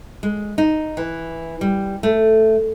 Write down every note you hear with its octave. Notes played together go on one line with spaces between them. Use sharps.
G#3
D#4
E3
G3
A3